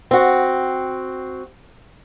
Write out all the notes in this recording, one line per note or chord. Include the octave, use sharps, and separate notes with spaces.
C4 F#4